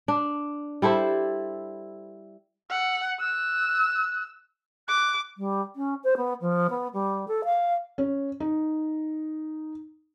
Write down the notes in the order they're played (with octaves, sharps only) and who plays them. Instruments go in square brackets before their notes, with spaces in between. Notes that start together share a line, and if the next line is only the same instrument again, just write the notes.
[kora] D4
G3 E4 A4 C5
[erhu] F#5 [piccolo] E6
[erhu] E6 [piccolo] F#6
[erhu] D6 [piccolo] F#6
[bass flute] G3
C#4
C5
B3
F3
B3
G3
A4
F5
[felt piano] C#4
D#4